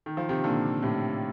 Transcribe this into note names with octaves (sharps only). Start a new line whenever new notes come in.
D#3
F3
C3 D#3
A#2 D3
A2 C3